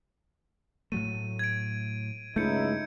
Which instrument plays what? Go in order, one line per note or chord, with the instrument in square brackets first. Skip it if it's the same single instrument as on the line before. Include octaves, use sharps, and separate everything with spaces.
[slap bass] A2 F#3 A3 [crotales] D#7
[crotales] G#6 D7
[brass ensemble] C#2 D#4 E4 [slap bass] G2 A3 [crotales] G6 C#7